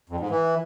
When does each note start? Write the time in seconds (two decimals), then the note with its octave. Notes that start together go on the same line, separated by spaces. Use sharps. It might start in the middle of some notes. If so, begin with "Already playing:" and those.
0.09 F2
0.20 G#2
0.30 E3